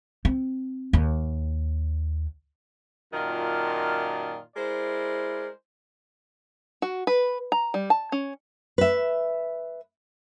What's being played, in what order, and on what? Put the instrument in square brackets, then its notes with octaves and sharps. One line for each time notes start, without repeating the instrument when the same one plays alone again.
[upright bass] C4
D#2
[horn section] F#2 A#2 D#3 F4 A5
G#3 E4 A#4 C5 D5
[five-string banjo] F#4
B4
A#5
G3
A5
C#4
[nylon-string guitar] B4 E5